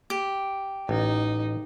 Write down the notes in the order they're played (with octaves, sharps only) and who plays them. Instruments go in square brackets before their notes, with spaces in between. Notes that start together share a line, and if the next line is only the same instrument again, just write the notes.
[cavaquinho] G4
[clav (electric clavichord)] A1 [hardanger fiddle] D#4